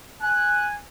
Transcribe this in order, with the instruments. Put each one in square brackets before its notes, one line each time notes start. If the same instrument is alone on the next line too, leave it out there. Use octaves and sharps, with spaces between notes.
[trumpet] G#5 [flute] F#6